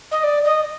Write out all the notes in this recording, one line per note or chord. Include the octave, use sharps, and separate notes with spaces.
D#5
D5
D#5